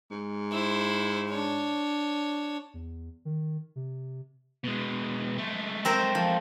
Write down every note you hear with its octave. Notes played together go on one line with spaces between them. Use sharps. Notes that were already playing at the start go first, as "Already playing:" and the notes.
G#2
E4 C5
D4 C#5
E2
D#3
C3
B2 G#3
G#3 A3
C4 A#4 C5
F3